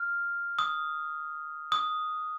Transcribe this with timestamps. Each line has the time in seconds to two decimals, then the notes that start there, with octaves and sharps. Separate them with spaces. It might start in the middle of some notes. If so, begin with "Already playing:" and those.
Already playing: F6
0.59 D#6
1.72 D#6